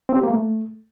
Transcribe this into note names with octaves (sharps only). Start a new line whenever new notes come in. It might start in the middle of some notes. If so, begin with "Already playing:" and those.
C4
G4
A#3
A3